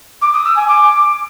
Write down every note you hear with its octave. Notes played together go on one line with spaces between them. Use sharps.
D6
D#6
E6
G#5
D6